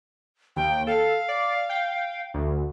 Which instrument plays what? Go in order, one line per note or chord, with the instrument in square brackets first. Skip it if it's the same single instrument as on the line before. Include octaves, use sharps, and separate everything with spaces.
[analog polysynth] D#2 [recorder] G5
[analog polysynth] A4 [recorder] F5
[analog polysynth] D5
G5
D2